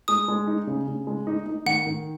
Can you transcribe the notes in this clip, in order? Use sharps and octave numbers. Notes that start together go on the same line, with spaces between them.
G#3 D#6
G#3
D#4
C#3
C#3
G#3
D#4
D#4
D#3 F#5
D#3